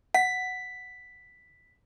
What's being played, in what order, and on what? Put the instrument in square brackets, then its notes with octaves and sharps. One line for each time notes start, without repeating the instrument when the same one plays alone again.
[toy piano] F#5 [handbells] B6